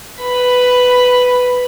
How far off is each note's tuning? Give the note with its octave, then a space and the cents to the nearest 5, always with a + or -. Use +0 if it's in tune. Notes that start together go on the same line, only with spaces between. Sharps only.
B4 +10 B5 +0